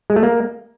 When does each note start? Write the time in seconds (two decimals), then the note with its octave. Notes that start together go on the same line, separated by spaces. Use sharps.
0.10 G#3
0.16 A3
0.23 A#3